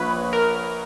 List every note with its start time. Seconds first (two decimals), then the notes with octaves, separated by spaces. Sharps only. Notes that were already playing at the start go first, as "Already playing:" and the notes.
Already playing: A#1 B4 C#5
0.33 A#4